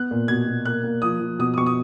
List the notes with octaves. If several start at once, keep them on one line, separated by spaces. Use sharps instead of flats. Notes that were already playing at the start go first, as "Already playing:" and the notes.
Already playing: B3 F#6
A#2
B2 G#6
B2
A#3 F#6
A#3
F3 D#6
F3
B2 D#6
D#6
B2 C#6
D#6